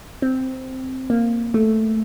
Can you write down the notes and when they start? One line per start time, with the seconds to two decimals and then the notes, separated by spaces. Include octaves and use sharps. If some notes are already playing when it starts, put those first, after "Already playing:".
0.22 C4
1.10 A#3
1.54 A3